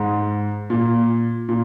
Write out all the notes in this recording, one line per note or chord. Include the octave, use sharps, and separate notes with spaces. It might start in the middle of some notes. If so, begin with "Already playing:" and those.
Already playing: G#2
A#2
A#2